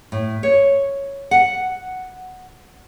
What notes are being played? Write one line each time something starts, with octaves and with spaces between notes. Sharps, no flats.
A2
C#5
F#5